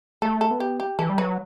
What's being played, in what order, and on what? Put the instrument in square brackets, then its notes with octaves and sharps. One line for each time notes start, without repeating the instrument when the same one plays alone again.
[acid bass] A3 [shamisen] A4
[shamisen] A4
[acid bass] B3
[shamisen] G4
G4
[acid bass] E3 [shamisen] A4
[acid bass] G3
[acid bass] F#3 [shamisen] B4